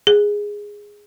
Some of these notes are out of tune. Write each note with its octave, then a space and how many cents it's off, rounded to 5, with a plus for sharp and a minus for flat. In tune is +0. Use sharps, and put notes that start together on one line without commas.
G#4 -10